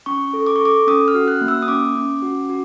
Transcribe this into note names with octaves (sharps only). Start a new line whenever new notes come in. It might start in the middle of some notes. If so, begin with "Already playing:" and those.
C#4 C#6
A4
D6
C#6
A4 D6
C#4 D#6
F6
F#4
F#6
A#3
E6
D#6
C#4 D6
C#4
F#4
F#4